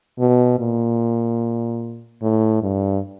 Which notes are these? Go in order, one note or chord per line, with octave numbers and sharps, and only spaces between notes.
B2
A#2
A2
G2